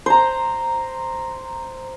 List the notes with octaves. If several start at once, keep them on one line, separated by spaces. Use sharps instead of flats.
C5 A#5